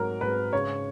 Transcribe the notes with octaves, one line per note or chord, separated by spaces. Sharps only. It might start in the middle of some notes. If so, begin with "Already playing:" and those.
Already playing: G#2 F#3 A#4
G#2 B4
C#3 C#5